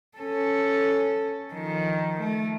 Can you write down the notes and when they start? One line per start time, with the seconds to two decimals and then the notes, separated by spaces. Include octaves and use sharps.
0.18 C#4 A4
1.53 D#3 F3
2.20 A3